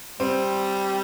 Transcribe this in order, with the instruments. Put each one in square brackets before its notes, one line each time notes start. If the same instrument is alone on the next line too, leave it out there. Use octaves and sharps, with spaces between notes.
[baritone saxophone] G3 [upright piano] C4